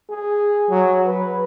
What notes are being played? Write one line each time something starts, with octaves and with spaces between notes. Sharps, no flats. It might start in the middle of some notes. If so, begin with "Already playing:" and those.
G#4
F#3
B4